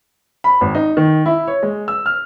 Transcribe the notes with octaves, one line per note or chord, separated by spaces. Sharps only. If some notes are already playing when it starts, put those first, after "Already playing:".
B5
G#1
D#4
D#3
E4
C#5
G#3
E6
F6